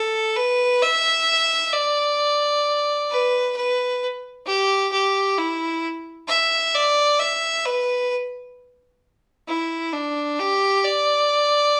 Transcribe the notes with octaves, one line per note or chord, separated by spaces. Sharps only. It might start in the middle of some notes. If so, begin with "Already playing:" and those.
Already playing: A4
B4
E5
D5
B4
B4
G4
G4
E4
E5
D5
E5
B4
E4
D4
G4
D5